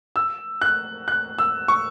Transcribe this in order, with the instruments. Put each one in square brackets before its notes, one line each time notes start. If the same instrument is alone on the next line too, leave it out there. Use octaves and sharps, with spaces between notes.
[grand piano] E6
F#6
F#6
E6
C#6